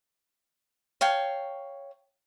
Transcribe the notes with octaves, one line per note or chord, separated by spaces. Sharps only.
C#5 F5 G5 A5